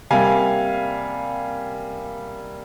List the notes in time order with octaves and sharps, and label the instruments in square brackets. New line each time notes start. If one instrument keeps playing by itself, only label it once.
[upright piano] C3 G3 A#3 F5 G#5